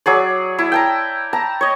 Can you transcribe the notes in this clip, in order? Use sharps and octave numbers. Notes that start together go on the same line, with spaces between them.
F#3 G#4 D5
E4
G5 A5 A#5
A5 A#5
C#5 D#5